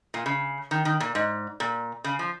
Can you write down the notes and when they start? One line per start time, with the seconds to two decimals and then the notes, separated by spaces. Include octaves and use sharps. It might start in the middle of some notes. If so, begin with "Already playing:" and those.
0.14 A#2
0.26 C#3
0.71 D#3
0.85 D#3
1.00 A#2
1.15 G#2
1.60 A#2
2.04 C#3
2.19 F3